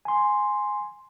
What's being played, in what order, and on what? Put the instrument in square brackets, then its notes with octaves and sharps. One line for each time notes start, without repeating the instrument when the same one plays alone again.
[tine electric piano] G#5 C6